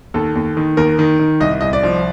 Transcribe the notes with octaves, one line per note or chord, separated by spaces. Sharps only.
D#2 A4
D#2
D#3
D#2 A#4
D#3
D#3
C2 D#5
C2 D#5
D5
F3